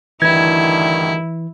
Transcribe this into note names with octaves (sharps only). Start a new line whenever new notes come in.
D2 G2 D#3 E3 E4 G#6